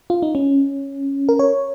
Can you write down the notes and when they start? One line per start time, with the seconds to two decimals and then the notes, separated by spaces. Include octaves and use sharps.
0.10 F4
0.22 D#4
0.35 C#4
1.29 A#4
1.39 C#5